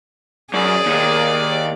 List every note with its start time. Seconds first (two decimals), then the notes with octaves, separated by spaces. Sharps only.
0.54 F#2 G#4 D5
0.86 D#2